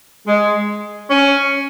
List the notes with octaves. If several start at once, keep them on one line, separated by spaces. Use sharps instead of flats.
G#3
C#4